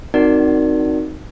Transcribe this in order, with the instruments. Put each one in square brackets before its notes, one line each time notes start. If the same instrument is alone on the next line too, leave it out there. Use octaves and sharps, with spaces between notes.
[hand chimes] C4 D#4 F#4 A#4 D5